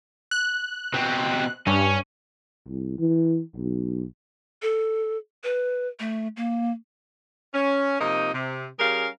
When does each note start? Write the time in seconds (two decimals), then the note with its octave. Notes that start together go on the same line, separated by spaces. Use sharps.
0.31 F#6
0.94 B2 C4
1.67 G2 C#4
2.68 C2
2.99 E3
3.56 B1
4.62 A4
5.44 B4
5.99 A3
6.37 A#3
7.55 C#4
8.00 C3 F3 A#3 D#4
8.34 C3
8.80 G3 C#4 G#4 A#4 F5